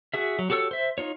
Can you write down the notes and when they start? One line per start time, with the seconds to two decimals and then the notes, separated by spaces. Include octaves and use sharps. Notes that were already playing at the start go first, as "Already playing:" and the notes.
0.14 F#4 G#4 E5
0.39 F#3
0.50 F#4 G4 A4 C#5 E6
0.71 C5 E5
0.98 D#4 F4 C#5